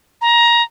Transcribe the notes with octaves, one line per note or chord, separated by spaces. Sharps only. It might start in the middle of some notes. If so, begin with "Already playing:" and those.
A#5